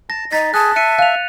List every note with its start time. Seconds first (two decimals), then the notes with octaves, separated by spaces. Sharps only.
0.10 A5 A#6
0.32 D#4 D#5 A6 B6
0.54 G#4 G#5 A5 F#6
0.76 E5 F#6 C#7 D#7
0.99 F5 F#6 F7